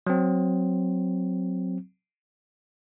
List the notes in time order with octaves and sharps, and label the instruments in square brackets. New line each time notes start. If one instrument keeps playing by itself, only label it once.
[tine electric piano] F#3 C4